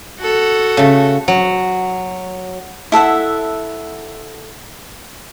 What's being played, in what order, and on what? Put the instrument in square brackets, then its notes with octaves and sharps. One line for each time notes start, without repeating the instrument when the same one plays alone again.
[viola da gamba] F#4 A4
[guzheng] C#3 A3
F#3
[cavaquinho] E4 A4 E5 F#5